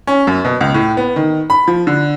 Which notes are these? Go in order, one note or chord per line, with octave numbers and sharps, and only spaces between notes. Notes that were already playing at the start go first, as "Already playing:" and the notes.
C#4
F#2
B2
C#2
A2
B3
D#3
B5
F3
D3